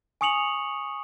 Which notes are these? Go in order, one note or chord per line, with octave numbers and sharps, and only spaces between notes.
G#5 C#6 D#6 C#7 F7 F#7